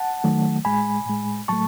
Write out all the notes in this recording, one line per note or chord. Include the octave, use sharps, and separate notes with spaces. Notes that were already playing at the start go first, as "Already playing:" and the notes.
Already playing: F#5 A5
D#3 F#3 A3
A2 G#3 G#5 B5
A2 G#3
A2 F#3 A3 A5 C#6